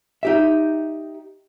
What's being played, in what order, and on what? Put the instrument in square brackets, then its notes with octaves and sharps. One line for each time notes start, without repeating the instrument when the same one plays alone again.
[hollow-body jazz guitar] D#4 G4 E5